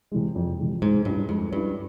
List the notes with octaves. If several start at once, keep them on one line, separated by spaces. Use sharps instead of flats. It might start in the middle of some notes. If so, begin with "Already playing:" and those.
C3 E3 G#3
F2
C3 E3 G#3
G#2 G#3
G2 C#4 E4
F2 G#3
G2 C#4 E4